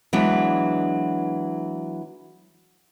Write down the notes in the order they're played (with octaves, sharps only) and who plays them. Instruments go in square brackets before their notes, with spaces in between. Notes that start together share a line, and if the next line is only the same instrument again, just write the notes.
[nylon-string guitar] E3 F#3 G#3 B3 D4